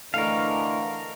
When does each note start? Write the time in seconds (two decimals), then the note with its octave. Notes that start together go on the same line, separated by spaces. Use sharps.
0.14 D3 E3 A3 A#4 D#5 F5 C#6